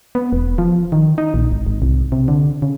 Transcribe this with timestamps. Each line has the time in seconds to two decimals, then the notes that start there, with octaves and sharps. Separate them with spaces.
0.15 B3
0.32 E1
0.58 F3
0.92 D#3
1.18 D#4
1.34 A#1
1.52 G#1
1.67 G#1
1.82 C2
2.12 C3
2.28 D3
2.62 C#3